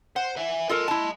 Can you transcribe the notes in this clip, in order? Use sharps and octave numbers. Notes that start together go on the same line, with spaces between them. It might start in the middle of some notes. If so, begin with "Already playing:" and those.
C5 F#5
B4 E5
F4 A4 A#4 D#5 C6
E4 A5